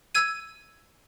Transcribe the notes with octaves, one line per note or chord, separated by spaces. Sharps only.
E6 G#6 D#7